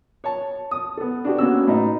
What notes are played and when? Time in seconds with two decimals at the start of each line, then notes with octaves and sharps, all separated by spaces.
0.24 C#5 A5
0.71 D#6
0.97 B3 A4
1.25 D4 F#4 G4
1.38 A#3 B3 C#4 F#4 E6
1.67 A2 D#4